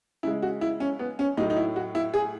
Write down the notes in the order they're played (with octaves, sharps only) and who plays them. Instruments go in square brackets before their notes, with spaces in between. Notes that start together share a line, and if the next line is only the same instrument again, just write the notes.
[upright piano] C#3 G#3 E4
F#4
E4
C#4
B3
C#4
A2 F#3 A3 D#4
D#4
E4
F#4
E4
G#4